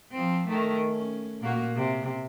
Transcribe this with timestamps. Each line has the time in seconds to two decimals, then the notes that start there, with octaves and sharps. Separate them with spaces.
0.11 F3 C4
0.48 D#3 A3
0.88 C#4
1.41 A#2 A#3 F#4
1.76 C3